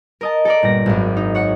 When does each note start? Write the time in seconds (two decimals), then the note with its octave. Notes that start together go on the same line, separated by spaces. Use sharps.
0.21 A#4 D#5 A5
0.45 A4 A#4 D5
0.63 G1 A#2 A#6
0.86 G#1 F#2
1.17 D#4
1.35 C#5 F#5 C#6